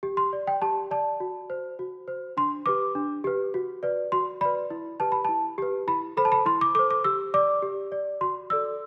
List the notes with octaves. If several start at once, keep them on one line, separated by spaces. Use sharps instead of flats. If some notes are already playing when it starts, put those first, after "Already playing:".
G4
C6
D5
G5
G4 A5
D5 A5
F#4
C5
F#4
C5
D4 C6
G4 B4 D6
D4
G4 B4
F#4
B4 D5
F#4 C6
B4 D5 B5
E4
G4 B4 A5
B5
E4 A5
G4 B4
E4 B5
A4 C5 B5
A5
B5
E4 C6
D6
A4 C5 D6
D6
G4 E6
D5 D6
G4
D5
F#4 C6
A4 D5 E6